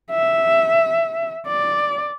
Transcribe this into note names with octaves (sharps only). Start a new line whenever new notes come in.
E5
D5